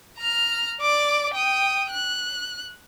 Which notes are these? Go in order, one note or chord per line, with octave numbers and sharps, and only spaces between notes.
A#5 F6
D5 D6
G5 D#6
F#6